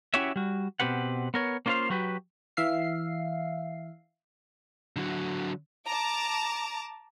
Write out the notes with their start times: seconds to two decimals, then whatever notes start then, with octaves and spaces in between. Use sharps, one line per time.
0.14 C#4 E4 F#4 G4 C#5 E5
0.36 G3 F#4
0.80 B2 D#3 C4 G4 B4 F#5
1.34 B3 A#4 C#5
1.66 A#3 C#4 F4 A#4 C5 F5
1.90 F#3 F#4 G4 B4
2.57 E3 E5 F5 C7
4.96 D3 F#3
5.86 A5 A#5 D6